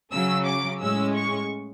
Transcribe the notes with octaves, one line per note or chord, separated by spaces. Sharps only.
C#3 F#3 C#4 E6
D6
A2 G#3 C#4 E6
C#6